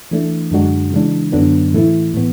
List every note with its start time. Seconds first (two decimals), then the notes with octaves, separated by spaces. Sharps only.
0.11 E3 A3 D4
0.51 F#2 D3 G#3 D4 F#4
0.92 C#3 E3 G#3 D4
1.32 F#2 D3 F#3 B3 D4
1.73 A2 E3 A3 E4
2.14 A2 E3 B3